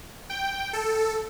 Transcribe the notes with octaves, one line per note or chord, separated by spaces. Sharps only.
G5
A4